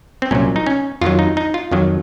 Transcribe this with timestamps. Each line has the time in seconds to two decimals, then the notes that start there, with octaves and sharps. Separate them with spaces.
0.22 C4
0.31 C2 A#2 F#3 C#4
0.56 D#4
0.66 C#4
1.01 F2 D#3 F#3 F4
1.19 D#4
1.37 D#4
1.54 F4
1.72 F2 D#3 F#3